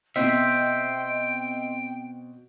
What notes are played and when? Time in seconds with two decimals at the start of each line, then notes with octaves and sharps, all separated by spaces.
0.16 B2 C4 C5 D#5 E5 G5